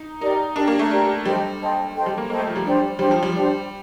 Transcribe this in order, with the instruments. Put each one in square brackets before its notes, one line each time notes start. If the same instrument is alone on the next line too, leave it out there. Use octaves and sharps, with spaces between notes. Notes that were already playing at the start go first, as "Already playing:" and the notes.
Already playing: [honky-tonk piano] D#4
[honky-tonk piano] D#4 [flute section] G4 A#4 D5
[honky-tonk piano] D4 [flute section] G4 A#4 D5
[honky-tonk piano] A#3
A3
[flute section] G4 A#4 D5
[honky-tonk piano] G3 [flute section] A4 C5 D#5 G5
[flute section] A4 C5 D#5 G5
A4 C5 D#5 G5
[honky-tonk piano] G3
A#3
[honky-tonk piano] A#3 [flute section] A4 C5 D#5 G5
[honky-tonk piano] A3
F3
G3
[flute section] D4 G4 C5
[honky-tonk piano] G3 [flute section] D4 G4 C5
[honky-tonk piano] F3
G3
[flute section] D4 G4 C5